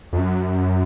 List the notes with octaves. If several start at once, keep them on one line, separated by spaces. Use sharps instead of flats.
F2
F#2